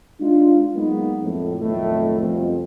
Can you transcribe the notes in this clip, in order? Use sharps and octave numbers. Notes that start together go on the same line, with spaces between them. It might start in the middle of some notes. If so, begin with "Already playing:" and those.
G#3 D4 D#4 F4
F#3 G#3 A#3 B3 D#4
F2 A2
B1 F2 A2 D#3 A3
C2 F2 B2 F3 C4